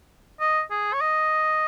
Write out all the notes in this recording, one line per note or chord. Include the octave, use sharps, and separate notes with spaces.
D#5
G#4
C#5
D#5